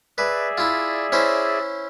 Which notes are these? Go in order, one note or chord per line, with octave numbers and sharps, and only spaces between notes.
G#4 B4 D5 E5
E4 F4
C#4 E4 C5